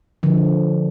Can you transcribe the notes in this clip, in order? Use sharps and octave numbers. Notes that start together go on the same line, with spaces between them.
D3 F3